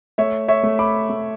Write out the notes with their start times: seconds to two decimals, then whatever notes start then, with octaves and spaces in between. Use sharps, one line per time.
0.18 A3 C#5 E5
0.48 C#5 E5
0.63 A3
0.79 B5 D6
1.10 A3